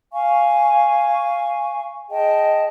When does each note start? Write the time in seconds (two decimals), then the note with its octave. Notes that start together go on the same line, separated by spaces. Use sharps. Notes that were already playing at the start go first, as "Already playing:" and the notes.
0.13 F5 G#5 C#6
2.11 G#4 D#5 G5 A5